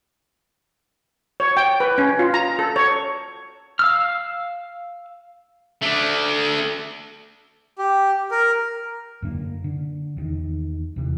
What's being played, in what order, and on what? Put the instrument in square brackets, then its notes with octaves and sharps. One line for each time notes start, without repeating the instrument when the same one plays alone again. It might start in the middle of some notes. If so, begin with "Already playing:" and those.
[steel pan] C#5
G5
B4
C#4
F4
A#5
A4
C#5
[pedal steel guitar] F5 E6 F6
[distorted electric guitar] A3 D4
[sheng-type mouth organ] G4
A#4
[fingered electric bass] F#2 D3 A#3
D3
E2 D#3
E2 C3 E3